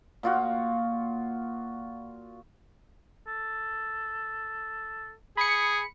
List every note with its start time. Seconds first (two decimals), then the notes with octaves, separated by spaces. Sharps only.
0.23 A#2 F4 F#4
3.27 A4
5.37 G#4 B5 C#7